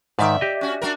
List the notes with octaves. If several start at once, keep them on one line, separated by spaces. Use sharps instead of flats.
G#2 D#3 D5 E5
G4 D#5
C#4 F#4
D4 F#4 A#4